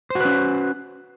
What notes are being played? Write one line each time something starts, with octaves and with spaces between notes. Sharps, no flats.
C#4 F#4 B4 C5